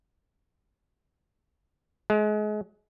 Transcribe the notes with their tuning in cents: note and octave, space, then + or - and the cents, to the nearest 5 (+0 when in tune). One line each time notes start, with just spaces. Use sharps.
G#3 +30